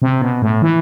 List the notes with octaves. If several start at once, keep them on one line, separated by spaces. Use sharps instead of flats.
C3
B2
A2
E3